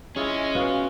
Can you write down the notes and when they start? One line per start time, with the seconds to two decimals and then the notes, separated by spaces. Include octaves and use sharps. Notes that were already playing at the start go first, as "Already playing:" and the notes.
0.16 G#3 C#4 E4 F4 G#4
0.55 B3 F4 F#4 F5